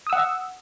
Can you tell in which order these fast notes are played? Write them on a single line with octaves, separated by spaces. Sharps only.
D#6 E6 F#5